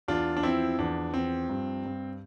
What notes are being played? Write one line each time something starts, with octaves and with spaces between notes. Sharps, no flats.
E2 D4 F4
D4
F3 C4 E4
E2 D4
F3 C4
G2
G2